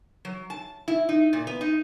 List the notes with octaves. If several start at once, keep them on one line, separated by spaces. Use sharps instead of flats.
F#3
A5
E4
D#4
A#2
B3
D#4